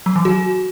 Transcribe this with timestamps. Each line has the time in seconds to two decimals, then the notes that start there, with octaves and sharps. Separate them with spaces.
0.06 F#3
0.16 E3
0.25 F#4